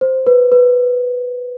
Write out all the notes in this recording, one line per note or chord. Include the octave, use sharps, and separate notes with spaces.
C5
B4
B4